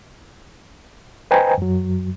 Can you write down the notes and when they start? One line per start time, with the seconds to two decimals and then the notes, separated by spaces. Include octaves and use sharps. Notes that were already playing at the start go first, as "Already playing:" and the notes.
1.31 B4 C5 D#5 G5 G#5 A#5
1.58 F#2 F#3